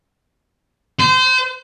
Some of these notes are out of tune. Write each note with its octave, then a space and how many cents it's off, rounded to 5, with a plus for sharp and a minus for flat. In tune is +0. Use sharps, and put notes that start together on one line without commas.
C5 -30